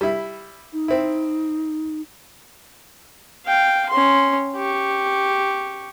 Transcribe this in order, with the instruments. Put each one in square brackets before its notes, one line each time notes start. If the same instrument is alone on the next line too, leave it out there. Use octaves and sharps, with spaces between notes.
[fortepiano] G3 E4
[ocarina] D#4
[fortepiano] C4 E4
[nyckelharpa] F5 G5
C#4 C6
G4 C#6